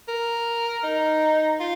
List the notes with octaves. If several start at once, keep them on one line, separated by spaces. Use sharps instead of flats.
A#4
D#4
F4